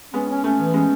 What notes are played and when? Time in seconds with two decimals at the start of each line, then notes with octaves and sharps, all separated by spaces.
0.14 G#3 B3 C#4
0.29 C#4
0.44 A3 C#4
0.59 E3
0.74 G#3 B3 C#4